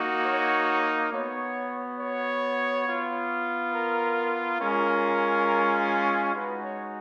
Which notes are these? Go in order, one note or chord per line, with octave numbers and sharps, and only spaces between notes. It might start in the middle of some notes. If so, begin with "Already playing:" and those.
Already playing: A#3 D#4 F#4
C#5
B3 F#4 C#5
C#5
B3 F4
A#4
G#3 C#4 F4 A#4
G#3 D#4 F#4 B4
C#5